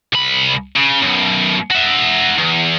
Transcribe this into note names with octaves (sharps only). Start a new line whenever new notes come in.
C2 B5
C#3
F#2 B2
F#4 E5
E2